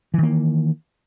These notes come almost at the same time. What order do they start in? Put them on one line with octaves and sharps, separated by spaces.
E3 D#3 A#3